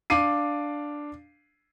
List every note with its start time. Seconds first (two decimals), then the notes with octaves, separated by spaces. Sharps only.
0.10 D4 F5 D6 C7 D#7